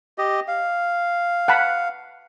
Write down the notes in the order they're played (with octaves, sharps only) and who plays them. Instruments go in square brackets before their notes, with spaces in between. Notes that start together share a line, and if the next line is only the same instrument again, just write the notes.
[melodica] G4 D#5
F5
[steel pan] F#5 A5 B5